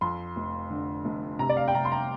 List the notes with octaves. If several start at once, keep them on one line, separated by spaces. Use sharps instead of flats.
F2 C6
F1
D3
F1
C3 A#5
D5
F5
G5
C3 A#5
C6
A#5